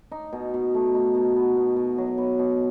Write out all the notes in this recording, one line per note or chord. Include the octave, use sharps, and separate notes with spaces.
D#4
B2
B2
A3
D#4
B2
B3
B2
B2
F#3
B3
B2